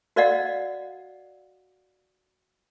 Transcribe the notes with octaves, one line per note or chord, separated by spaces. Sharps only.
F#4 A#4 D5 D#5 F5 F#5